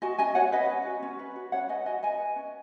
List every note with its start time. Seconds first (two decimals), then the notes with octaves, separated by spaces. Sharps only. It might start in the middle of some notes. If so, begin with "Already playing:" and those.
0.02 F#4 D#5 G#5
0.18 C#4 D#5 G#5
0.35 F#4 C#5 F#5
0.52 C#4 B4 D#5
0.70 C#4
0.86 F#4
1.02 C#4
1.19 B4
1.36 F#4
1.52 C#4 C#5 F#5
1.69 B4 D#5 G#5
1.86 F#4 D#5 G#5
2.03 B4 D#5 G#5
2.19 B4
2.36 C#4